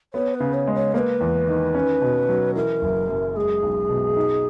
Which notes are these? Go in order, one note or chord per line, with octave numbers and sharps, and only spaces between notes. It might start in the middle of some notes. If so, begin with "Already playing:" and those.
B3 C#5
B4
C#3
C#5
G#3
C#5
A#3 B4 C#5
E2
D#3
C#4
B2
F#3
E3 A#4
F#1
F#2
G#3 G#4
B1
B2
D#4